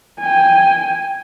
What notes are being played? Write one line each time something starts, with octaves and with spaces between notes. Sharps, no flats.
G5 G#5